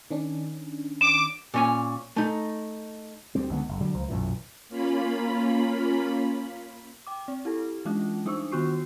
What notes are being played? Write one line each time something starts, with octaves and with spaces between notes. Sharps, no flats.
D#3 C#4 D4
D6 E7
A#2 C#4 G#5
A3 D#4
D2 G3 C4
C#2 D3 B3
F#1
D3 F#3 G3
C#2 F3
B1 F#2 A#2 E3
A#3 C#4 F4 B5
G5 D6
C4
E4 G4 A4
E3 G#3 C#4 D4 F4
G3 D4 D#4 C5 C#6 E6
D#3 B3 F4 F#4 C#6 C7